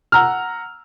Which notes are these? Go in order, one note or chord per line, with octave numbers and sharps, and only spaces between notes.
F#5 A#5 E6 F6